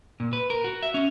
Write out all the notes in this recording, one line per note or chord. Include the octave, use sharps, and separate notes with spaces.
A#2
B4
A#4
F#4
E5
C#4